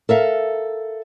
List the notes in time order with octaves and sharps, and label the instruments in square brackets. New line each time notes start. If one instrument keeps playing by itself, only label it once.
[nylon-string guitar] A4 A#4 E5 F5